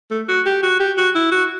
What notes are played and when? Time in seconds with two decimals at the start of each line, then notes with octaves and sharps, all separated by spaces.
0.11 A3
0.29 F#4
0.46 G4
0.63 F#4
0.80 G4
0.98 F#4
1.15 E4
1.32 F#4